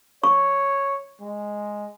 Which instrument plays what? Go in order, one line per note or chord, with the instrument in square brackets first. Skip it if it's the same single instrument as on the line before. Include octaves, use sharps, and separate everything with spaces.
[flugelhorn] C#5 [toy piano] C#6
[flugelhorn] G#3